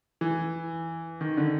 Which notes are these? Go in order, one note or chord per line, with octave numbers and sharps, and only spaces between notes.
E3
D#3
D3